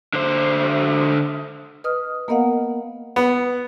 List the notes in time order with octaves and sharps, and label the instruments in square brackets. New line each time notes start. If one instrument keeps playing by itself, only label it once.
[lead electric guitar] D3 C5
[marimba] B4 D#5 D#6 F6
A#3 B3 A#4 D#5 F5 F#5
[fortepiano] B3